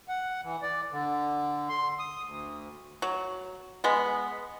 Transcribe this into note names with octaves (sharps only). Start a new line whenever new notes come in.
F#5
E3
D5
D3
C6
D#6
D2
F#3
G#3 B3